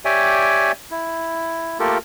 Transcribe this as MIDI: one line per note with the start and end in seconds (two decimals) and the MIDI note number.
0.05 0.72 67
0.05 0.72 73
0.05 0.72 74
0.05 0.72 76
0.05 0.72 79
0.05 0.72 80
0.91 1.78 64
1.80 1.98 57
1.80 1.98 58
1.80 1.98 65
1.80 1.98 67
1.80 1.98 69
1.80 1.98 70